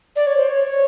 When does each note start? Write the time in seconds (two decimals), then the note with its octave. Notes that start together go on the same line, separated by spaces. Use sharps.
0.15 D5
0.26 C#5
0.37 C5
0.47 C#5